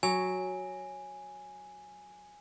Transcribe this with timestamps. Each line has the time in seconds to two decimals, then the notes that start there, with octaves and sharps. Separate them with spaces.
0.03 F#3 G#5